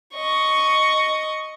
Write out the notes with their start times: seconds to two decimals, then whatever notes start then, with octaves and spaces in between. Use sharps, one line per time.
0.14 D#5 C#6